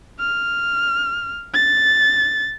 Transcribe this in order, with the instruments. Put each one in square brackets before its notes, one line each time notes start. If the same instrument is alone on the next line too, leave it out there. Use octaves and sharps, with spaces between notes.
[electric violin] F6
A6